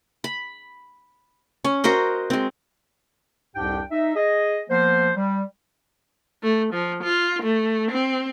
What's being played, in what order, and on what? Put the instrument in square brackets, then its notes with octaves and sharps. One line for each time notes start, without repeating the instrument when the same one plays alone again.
[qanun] B5
C#4
F#4 A#4 C5 D#5
G#3 C4
[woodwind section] C2 F2 G#2 D4 G4 G5
D#4 E5
G#4 D#5
F3 A#3 B3 C5
G3
[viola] A3
F3
F4
A3
C4